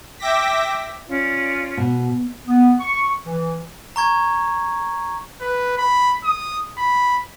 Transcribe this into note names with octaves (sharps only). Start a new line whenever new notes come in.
E5 G5 D6 A#6 B6
C#4 F4 D5
B2
B3
C#6
E3
A#5 C#6 G#6
B4
B5
D#6
B5